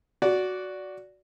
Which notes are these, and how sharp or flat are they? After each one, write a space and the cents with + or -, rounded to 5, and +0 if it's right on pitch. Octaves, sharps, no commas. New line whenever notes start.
F#4 +0 D5 -15